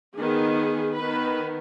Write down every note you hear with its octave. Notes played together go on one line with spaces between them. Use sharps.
D#3 B3 G#4
D#3 B3 B4